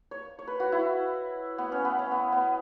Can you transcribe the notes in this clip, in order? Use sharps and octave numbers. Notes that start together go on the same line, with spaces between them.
C#5
C#5
B4
F#4
E4
B3
C#4
B3
C#4
B3
B3